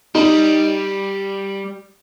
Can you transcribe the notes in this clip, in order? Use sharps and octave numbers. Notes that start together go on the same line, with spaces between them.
G3 D#4